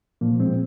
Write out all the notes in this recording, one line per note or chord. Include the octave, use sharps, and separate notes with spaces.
A#2 F3 A#3
G#3 C4